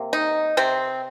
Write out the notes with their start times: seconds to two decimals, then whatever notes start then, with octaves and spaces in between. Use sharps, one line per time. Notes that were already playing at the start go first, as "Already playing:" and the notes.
Already playing: C3 A#3
0.13 D#4
0.57 C3 C4